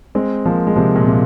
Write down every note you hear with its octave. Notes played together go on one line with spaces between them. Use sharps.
G#3 C4
F3 A#3
G#3
C3 F3
A#2
C3